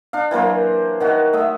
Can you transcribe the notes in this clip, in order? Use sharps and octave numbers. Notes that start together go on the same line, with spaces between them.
D4 F5
E3 F#3 A#3 C5
D#3 F#4 F#5
A3 D#5 E5